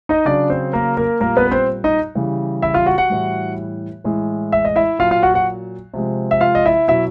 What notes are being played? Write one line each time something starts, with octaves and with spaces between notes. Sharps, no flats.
D#4 D#5
C#3 F#3 D4 D5
C4 C5
A#3 A#4
A#3 A#4
A#2 G3 A#3 A#4
B3 B4
B4
C4 C5
D#4 D#5
C#3 E3 G3
E4 E5
F4 F5
F#4 F#5
F#4 F#5
A2 E3 G3
A2 E3 G#3
E5
D#5
E4 E5
A#2 F#3 F4 F5
F4 F5
F#4 F#5
F#4 F#5
C3 F3 G#3
E5
F4 F5
D#5
E4 E5
B2 F#3 E4 E5